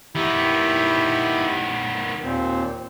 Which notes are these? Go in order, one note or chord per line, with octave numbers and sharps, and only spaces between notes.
D#3 B3 E4 G4 B5
D#2 A#2 C4